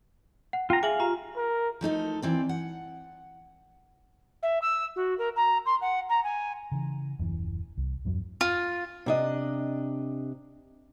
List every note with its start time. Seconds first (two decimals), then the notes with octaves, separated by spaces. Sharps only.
0.53 F#5
0.70 F4 G5 A#5
0.83 G#4 E5 F5 G#5 F#7
1.00 F4 G4 A#5
1.36 A#4
1.81 F3 A3 D#4 A4
2.22 E3 C4 D5
2.49 F#5
4.42 E5
4.61 E6
4.95 F#4
5.18 A#4
5.36 A#5
5.65 C6
5.81 F#5
6.09 A#5
6.23 G#5
6.72 C#3 E3
7.19 D#1 F#2 E3
7.77 C2
8.05 E2 G2 F#3
8.41 F4
9.06 C3 D4 D#5